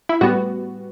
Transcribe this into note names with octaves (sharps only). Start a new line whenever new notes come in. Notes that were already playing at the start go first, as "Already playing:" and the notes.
E4
A2 G3 B3 F#4